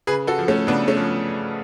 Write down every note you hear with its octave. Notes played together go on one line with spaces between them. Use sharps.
C#3 G#4 B4
F#4 A4
F3
A3 C#4
C#3 B3 D4
A3 C#4
F3